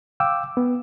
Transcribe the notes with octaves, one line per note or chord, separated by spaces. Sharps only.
F5 G5 D6 E6
B3